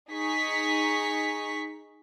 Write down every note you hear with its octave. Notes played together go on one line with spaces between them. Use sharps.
D#4 G#4 C#6 B6